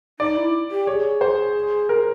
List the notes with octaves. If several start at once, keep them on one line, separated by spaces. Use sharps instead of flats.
D#4 D5
E4
G4
G#4 C#5
C5
A#4